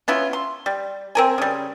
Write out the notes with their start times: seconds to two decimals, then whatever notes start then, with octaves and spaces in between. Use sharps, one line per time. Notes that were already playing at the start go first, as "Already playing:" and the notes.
0.08 B3 C#4 E4 F4
0.33 C6
0.66 G3
1.15 C4 A#4 G#5
1.38 C#3 G3